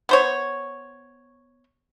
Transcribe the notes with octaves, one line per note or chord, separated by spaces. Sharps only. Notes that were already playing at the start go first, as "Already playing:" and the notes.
B3 C5 C#5